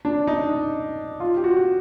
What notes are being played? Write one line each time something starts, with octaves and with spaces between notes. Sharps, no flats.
D4
D#4
F4
G4
F#4